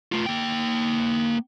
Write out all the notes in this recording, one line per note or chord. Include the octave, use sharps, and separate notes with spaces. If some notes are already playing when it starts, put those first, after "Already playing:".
A3 F4
A#3 G5